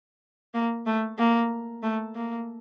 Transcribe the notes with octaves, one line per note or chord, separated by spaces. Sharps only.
A#3
A3
A#3
A3
A#3